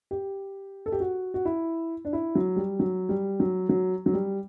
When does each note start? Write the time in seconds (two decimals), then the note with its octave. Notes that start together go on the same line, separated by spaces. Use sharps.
0.11 G4
0.86 A4
0.92 G4
1.00 F#4
1.34 F#4
1.45 E4
2.05 D4
2.13 E4
2.35 F#3
2.56 G3
2.79 F#3
3.09 G3
3.40 F#3
3.69 F#3
4.06 F#3
4.13 G3